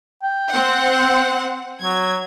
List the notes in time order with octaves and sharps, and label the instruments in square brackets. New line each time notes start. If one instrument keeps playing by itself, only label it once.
[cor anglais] G5
[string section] C4 C5 F#5
[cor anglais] F#3 [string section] G#6